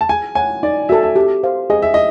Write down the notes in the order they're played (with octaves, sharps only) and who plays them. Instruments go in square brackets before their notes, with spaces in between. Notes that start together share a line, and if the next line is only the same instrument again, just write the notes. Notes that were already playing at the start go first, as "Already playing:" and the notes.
[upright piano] A5
[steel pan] G#4 [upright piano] G#5
[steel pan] C#5 F#5 [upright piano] G#5
[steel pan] D#4 [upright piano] D5
[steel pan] F#4 A4 [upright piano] E5
[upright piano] E5
[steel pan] G4
C5 F5
[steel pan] G#4 [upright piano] D#5
[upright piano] E5
D#5